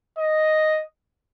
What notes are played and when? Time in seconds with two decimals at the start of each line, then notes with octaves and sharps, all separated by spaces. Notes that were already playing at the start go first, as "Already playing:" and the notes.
0.19 D#5